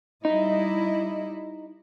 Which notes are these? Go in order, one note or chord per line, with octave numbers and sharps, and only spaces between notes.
G3 D#4 E4 D#5